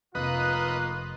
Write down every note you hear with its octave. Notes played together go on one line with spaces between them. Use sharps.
F1 A#3 D#4 F4 B4 D#5 F#6